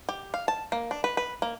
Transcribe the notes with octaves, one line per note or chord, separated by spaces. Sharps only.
G4
F5
A5
A#3
D4
B4
B4
A#3